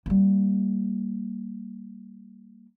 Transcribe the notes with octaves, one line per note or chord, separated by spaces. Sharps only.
G3 A#3